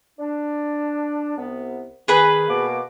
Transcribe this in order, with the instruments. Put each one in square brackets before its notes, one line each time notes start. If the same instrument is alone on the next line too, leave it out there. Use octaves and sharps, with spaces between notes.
[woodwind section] D4
C2 B3
[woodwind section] D#3 [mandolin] G#4 B4 B5
[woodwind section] B2 A#3 D6